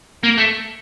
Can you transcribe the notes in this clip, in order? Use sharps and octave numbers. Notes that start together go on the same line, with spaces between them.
A#3
A3